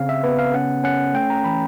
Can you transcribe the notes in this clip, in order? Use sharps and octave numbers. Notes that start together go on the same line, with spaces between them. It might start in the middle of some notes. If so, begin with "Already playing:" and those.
Already playing: C#3 C4 F5
E5
B3 B4
F5
C#4 F#5
C#4 F#5
A3 G5
A#5
E3 B5